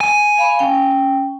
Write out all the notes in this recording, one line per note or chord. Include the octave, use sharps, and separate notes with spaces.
G#5
F5 B5
C#4 G5